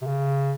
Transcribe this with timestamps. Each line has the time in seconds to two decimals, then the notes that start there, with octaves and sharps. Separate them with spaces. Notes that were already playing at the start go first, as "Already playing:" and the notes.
0.02 C3
0.07 C#3